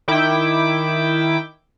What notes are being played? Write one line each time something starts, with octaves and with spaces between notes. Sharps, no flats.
D#3 E4 G5 D6